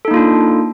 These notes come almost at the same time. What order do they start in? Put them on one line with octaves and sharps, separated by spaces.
A4 D#4 A#3 F4 D4